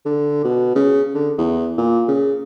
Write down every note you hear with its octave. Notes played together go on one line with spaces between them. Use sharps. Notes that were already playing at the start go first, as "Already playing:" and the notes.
D3
B2
C#3
D3
E2
A#2
C#3